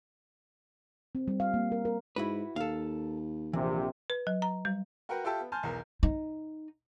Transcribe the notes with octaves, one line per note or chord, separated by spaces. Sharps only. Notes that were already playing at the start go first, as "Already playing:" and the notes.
C4
G3
F5
A#3
A#4
A#4
G#2 E4 F#4 B4
D#2 A4 F5
A#1 C3 E3
B4
F#3
A#5
G3
F#4 A#4 B4 F#5 G5
F4 G4 A4 E5 G5 A5
B3
G#5 A5 C6 F6 G6
B1 E2 A#4
D#4